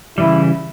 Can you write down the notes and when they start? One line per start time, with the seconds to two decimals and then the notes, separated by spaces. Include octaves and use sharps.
0.18 C#3 E3 G3 E4